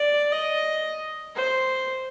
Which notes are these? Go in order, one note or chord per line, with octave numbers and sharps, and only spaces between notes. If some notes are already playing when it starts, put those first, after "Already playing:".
Already playing: D5
D#5
C5